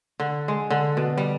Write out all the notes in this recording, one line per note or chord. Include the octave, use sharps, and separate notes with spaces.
D3
G#3
D3
B2
G3